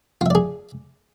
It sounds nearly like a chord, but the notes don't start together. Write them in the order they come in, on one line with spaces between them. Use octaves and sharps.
F4 E5 D5 G#4